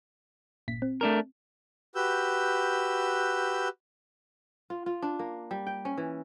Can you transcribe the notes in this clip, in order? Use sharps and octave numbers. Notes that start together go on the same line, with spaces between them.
G1 A#2 B6
C4
A3 D4 A#4
F#4 G4 B4 E6 G6
F4
F4
D4
A#3
G3
G5
C#4
E3